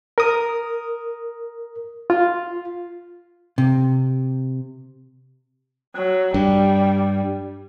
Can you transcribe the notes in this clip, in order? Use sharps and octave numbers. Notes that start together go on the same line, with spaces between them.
A#4 D#6
F4
C3
F#3
G2 G3